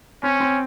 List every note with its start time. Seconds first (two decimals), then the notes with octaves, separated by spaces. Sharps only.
0.23 C4 C#4
0.40 C4